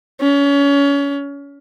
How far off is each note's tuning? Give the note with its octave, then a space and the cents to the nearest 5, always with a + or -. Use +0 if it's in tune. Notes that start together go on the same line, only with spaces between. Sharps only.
C#4 +30